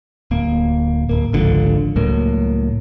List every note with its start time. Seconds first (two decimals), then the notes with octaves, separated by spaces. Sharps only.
0.31 D1 A#3
1.09 D1 A#3
1.33 G#1 C#2 D3 F3
1.96 C#2 A2 F#3 A#3